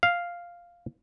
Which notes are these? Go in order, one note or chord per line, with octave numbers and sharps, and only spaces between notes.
F5